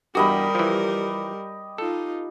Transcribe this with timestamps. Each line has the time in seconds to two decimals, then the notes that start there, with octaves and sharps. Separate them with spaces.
0.15 E2 G2 G3 F#4 G4 A#4 D#5 B5
0.55 E3 F3
1.78 D#4 F4 A4